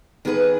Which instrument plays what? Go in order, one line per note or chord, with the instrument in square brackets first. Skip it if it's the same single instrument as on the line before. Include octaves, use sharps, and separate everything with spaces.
[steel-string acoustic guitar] D#3 B3 G#4 B4